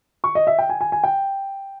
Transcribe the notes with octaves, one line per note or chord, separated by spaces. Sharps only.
C#6
D#5
E5
G5
G#5
G#5
G#5
G5